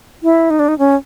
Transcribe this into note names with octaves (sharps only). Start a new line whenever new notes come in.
E4
D#4
D4
D#4
C#4